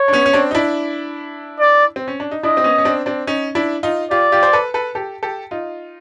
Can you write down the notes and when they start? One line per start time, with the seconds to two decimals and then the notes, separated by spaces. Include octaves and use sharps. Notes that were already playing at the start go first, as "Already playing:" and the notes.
Already playing: C#5
0.08 D4
0.13 B3 C#4
0.26 C#4
0.33 C4 D4
0.51 D#4
0.55 D4 E4
1.60 D5
1.96 C4
2.08 C#4
2.20 D4
2.31 D#4
2.43 D4 E4 D#5
2.57 C4
2.64 B3 C#4
2.78 C#4
2.85 C4 D4
3.06 C4 D4
3.27 C#4 D#4
3.55 D4 E4
3.83 D#4 F4
4.11 F4 G4 D5
4.32 F4 G4
4.43 C5
4.53 A4 B4
4.74 A4 B4
4.95 G4 A4
5.23 G4 A4
5.51 D#4 F4